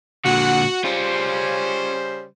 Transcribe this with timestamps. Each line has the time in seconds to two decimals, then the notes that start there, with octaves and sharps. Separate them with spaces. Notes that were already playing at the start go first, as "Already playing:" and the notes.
0.25 A#2 D3 F#4 F#5
0.84 C#3 G3 C#4 F4 C5